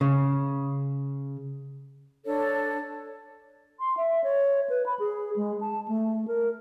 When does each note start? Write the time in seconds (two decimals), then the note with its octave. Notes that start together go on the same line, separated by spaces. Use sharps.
0.01 C#3
2.25 D4 A4 C#5
3.80 C6
3.97 E5
4.24 C#5
4.70 B4
4.86 B5
4.99 G#4
5.36 G#3
5.61 A5
5.88 A3
6.28 A#4